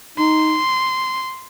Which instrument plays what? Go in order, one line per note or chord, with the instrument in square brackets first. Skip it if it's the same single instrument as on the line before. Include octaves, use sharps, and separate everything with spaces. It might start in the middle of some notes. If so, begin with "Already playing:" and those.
[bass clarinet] D#4 [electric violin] C6